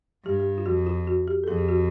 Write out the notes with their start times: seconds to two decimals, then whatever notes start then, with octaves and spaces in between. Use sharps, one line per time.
0.25 G2 G4
0.39 G4
0.58 F4
0.66 F2 F#4
0.87 F4
1.07 F#4
1.28 G4
1.44 A4
1.48 F2 G#4
1.59 G4
1.69 F#4